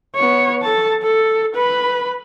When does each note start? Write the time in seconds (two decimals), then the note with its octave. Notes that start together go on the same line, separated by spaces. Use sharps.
0.15 B3 C#5
0.63 A4 A5
1.03 A4
1.55 B4 B5